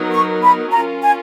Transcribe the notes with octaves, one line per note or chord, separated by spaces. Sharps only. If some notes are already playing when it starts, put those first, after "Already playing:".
Already playing: F#3 B3 D#4 A#4
C#6
B5
C#4 F4 A#4 A#5
G#5